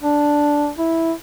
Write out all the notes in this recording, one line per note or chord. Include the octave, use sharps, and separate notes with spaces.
D4
E4